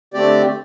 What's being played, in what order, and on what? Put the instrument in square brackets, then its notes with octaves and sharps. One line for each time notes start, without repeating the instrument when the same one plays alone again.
[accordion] D3 A3 C4 G4 D5